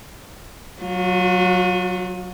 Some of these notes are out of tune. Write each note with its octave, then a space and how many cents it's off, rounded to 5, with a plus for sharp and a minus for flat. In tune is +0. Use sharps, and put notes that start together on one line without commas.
F#3 +0 F4 +45